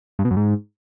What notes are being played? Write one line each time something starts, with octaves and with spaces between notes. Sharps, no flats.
G2
B2
F#2
G#2